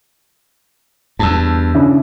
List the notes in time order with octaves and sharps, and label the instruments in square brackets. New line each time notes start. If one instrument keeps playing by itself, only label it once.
[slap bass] E2 G2 [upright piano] A5 E6
[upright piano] C#3 D4 E4